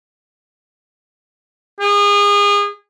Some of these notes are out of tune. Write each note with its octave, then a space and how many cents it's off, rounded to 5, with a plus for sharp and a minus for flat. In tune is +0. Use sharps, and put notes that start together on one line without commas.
G#4 -30